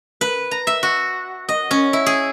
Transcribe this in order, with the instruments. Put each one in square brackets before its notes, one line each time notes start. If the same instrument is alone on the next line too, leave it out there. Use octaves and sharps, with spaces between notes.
[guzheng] B4
A#5
E5
F#4
D#5
C#4
E4
G#4